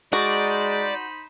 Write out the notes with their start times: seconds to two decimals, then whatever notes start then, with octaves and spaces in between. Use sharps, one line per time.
0.13 G#3 D#4 F#4 C5 D5 B5